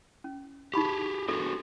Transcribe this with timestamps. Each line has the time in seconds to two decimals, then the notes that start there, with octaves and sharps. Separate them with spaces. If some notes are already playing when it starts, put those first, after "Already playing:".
0.24 C#4
0.74 D#4 G4 G#4 B5 C#6
1.29 D4 F#4 G#4 A4